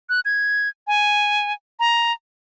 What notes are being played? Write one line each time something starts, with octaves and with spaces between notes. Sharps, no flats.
F#6
G#6
G#5
A#5